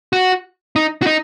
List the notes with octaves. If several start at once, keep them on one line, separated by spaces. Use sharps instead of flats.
F#4
D#4
F#4
D#4